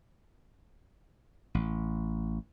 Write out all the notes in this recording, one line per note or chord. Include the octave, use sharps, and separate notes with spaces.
A1